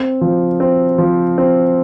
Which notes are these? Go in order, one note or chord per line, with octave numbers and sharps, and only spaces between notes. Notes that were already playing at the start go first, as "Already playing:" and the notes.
Already playing: C4
F3
C4
F3
C4